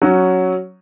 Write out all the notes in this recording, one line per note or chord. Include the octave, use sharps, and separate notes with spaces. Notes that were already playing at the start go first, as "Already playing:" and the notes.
F#3 C#4 F#4